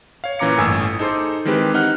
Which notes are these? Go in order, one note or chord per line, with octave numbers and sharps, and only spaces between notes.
C#5 F5
A#2 E3 C#4 A#5 D6 C#7
G1 A2 G#5 D#6 E6
D#4 G#4 A4 C5 C6 D6
D#3 E3 G#3 C4 G4 B4
C4 D#4 F#5 F6 F#6